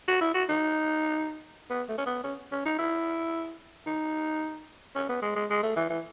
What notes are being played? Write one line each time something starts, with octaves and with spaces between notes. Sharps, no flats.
F#4
E4
F#4
D#4
B3
A3
C#4
B3
C#4
C#4
D#4
E4
D#4
C#4
B3
G#3
G#3
G#3
A3
E3
E3